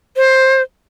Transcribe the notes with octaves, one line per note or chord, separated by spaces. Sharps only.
C5